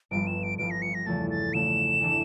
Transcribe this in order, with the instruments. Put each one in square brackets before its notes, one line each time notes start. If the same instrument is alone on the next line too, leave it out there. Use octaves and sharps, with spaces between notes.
[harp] G1 G2 F3 [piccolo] D7
[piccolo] E7
D7
[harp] G1 G2 F3 [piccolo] D7
[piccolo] A#6
C#7
A#6
[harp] E2 C#3 F3 A3 [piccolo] A6
[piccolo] A6
[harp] E2 C#3 F3 A3 [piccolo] E7
[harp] E3 A3 D4 A4 E5